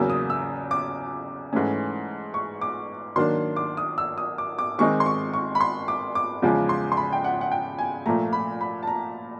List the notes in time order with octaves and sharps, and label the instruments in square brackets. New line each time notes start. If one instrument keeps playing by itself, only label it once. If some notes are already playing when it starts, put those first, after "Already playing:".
Already playing: [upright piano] E2 C#3 F#3 A#3 E6
D#6
E6
D6
G#2 E3 A3 C#4
C#6
D6
D#3 F#3 A#3 D4 C6
D6
D#6
E6
D#6
D6
D6
D#3 G#3 C4 D#4 C#6
C6
C#6
C#6
B5
C6
D6
D6
E2 C#3 F3 G#3
C6
C6
B5
G5
F#5
F#5
G5
G#5
A#2 F3 A3 A#5
B5
B5
A5
A#5